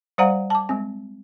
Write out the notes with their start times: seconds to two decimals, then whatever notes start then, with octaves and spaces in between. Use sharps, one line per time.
0.18 G3 C5 D5 F5 F#5 A#5
0.50 A5 D6
0.69 G#3 C4